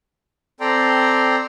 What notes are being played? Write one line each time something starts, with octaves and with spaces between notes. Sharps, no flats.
C4 A4 D5 G5 A#5 C6